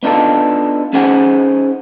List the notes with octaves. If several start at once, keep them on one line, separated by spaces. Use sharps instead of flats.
B3 D4 D#4 F4 A4
C#4 D#4 G#4 C5 F#5 G#5